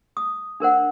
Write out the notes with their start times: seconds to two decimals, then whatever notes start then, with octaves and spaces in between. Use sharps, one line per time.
0.17 D#6
0.60 D4 A#4 C5 F#5